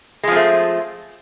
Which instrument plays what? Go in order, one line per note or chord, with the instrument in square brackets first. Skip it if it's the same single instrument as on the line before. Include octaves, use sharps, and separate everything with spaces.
[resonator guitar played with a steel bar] G#3
F3
C4
A3